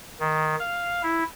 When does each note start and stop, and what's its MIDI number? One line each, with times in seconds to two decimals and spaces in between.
0.20 0.56 51
0.60 1.02 77
1.03 1.24 64